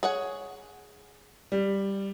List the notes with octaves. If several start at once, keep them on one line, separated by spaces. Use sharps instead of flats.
G#4 C#5 F#5
G3